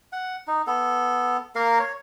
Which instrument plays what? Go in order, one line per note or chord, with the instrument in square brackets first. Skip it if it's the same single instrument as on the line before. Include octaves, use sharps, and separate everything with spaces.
[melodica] F#5
D#4
B3 A4
A#3 A#4 F5
C#5